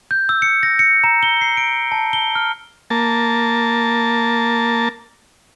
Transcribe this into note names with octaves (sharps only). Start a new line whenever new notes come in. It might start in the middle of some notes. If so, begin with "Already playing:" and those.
G6
E6
C#7
A#6
C#7
A#5
G7
C7
D7
A5
G7
F6
A#3 A5